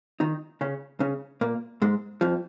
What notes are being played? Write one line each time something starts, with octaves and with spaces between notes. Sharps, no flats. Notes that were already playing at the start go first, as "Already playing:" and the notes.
D#3 D#4
C#3 C#4
C#3 C#4
A#2 A#3
G#2 G#3
F2 F3